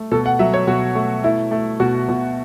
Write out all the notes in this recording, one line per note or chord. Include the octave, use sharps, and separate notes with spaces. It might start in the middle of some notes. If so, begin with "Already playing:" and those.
Already playing: A3
B2 A4
F#5
F#3 E5
C#5
B2 F#4
A3
A3 E4
A3
B2 F#4
B2